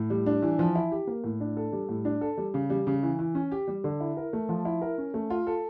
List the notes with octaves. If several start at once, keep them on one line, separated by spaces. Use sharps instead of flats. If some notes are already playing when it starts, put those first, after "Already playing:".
Already playing: A2
G3
D4
E3
F3
E4
G4
A#3
A2
D4
A4
G3
A2
D4
A4
G3
C#3
G3
C#3
E3
E3
C#4
G4
G3
D3
E4
A#4
A3
F3
E4
A#4
C#4
A3
F4
A4